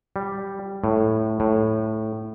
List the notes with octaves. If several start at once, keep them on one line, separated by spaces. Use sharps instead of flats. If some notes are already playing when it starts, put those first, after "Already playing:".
G3
A2
A2